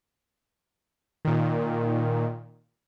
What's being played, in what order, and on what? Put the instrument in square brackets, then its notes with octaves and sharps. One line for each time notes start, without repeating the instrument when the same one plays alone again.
[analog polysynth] A#2 D#3